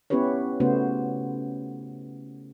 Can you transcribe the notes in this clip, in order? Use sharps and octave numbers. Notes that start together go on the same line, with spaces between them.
B3 C#4 E4 G4 B4 C#5
C#3 A3 B3 F#4 C5